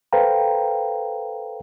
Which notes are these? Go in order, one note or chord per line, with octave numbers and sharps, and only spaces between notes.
A4 B4 C5 F5 G5 A#5